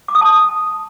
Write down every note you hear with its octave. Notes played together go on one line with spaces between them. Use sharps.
D6
D#6
A5